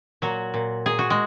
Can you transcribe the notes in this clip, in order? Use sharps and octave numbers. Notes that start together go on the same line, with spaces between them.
A#2 F#3 F#4
A#2
A#2 G#4
F#4
G#3